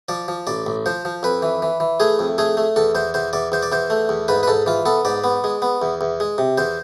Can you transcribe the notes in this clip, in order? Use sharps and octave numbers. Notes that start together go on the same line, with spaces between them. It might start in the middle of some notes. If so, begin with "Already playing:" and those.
F3 D5
F3
A1 D5
A1
F3 C5
F3
F2 B4
E3
E3
E3
A3 G#4
F2
A3 G#4
A3
E2 A4
E2 C5
E2 C5
E2 D5
E2 C5
D5
E2 C5
A3
E2
G#2 B4
B4
G#2 A4
E3 F4
B3 A4
G#2 D5
B3
G#3
B3
E2
E2
G#3
C3
E2 C5